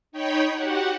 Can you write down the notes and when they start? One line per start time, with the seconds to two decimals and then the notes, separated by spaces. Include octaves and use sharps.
0.12 D#4 C#5 G5 B5 G6
0.55 F#4 G4 F#5